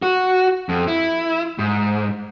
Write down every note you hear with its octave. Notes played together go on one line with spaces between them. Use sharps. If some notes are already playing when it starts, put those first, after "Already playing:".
F#4
F2
E4
G#2